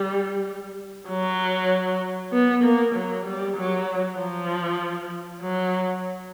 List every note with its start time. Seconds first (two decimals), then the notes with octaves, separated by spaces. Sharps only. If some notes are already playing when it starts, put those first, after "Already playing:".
Already playing: G3
1.09 F#3
2.33 B3
2.64 A#3
2.95 F#3
3.26 G3
3.57 F#3
4.18 F3
5.42 F#3